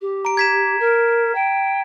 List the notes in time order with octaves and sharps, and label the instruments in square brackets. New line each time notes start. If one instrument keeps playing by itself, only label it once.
[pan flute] G4
[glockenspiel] A#5 D7
G#6 B6 E7
[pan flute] A#4
G5